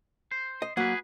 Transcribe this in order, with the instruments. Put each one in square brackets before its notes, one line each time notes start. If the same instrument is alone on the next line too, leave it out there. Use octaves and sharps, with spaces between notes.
[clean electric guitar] C5
[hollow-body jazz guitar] D#5
[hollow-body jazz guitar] F#3 A#3 F#5 [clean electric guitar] G#4 B4